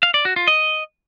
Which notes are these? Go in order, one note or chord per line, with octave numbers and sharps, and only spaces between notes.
F5
D5
F#4
F4
D#5